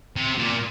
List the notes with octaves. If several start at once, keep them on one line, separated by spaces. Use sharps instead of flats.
C3
A#2